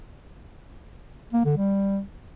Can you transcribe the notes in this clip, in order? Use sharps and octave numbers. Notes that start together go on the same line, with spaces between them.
A#3
D3
G3